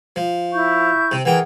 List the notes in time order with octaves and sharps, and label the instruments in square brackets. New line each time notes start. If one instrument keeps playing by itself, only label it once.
[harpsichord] F3
[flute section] E4 C#6 G6
[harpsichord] C3
[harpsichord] E3 G5 [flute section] G#4 A#4 F#5